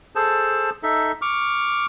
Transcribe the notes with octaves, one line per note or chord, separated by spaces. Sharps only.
G#4 A4 C5 A5
D#4 A4 E5
C#6 D6 F6